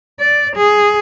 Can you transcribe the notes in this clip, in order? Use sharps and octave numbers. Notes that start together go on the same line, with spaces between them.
D5
G#4